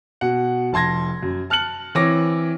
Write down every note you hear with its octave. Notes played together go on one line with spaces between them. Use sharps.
B2 F#5
F1 A5 C6 G#6 A#6
F#2
A5 F6 F#6 C#7 F#7
E3 C4 C#5 D6 A#6